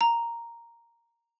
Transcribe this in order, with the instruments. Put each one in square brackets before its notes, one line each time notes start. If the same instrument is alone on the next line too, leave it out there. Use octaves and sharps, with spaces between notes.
[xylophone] A#5